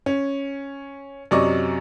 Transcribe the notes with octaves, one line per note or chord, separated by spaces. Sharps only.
C#4
F#2 C3 F#3 D5 D#5 C#6